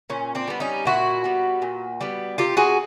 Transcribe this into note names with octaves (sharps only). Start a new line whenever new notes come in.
A#2 C#4
C4 D4
G3 B3
C#4 D#4
A#2 E4 F#4
G3 B3
A#2
G3 B3
C3 F4 G4
F#4 G#4